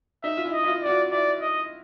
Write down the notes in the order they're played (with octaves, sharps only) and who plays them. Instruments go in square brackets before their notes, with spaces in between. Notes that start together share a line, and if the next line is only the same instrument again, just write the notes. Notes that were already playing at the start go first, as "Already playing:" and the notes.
[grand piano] D#4 [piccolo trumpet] E5
[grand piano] F4
E4
[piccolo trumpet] D#5
[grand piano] E4
F4
[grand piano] F#4 [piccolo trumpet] D5
[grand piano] F4
[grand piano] E4 [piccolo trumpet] D5
[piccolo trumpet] D#5